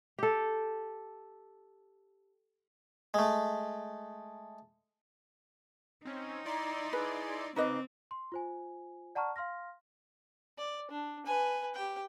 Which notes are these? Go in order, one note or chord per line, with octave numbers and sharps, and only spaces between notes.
G4 A4
G#3 A3
C4 C#4 D#4
E4 D5 A#5 C6
G#4 B4
C#3 C4 D#4 B4 D#5 D6
C6
F4 C5 G#5
D5 F#5 A5 A#5 C#6 F6
F5 C6 F6 A#6
D5
D4
B4 G#5
G4 G5